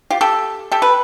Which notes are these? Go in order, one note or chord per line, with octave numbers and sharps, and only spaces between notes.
F4 G4
G4 A4
G4 A4
B4